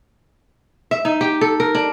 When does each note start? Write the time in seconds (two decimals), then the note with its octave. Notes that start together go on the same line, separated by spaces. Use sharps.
0.91 E5
1.05 D#4
1.21 G4
1.41 A4
1.60 A#4
1.75 D4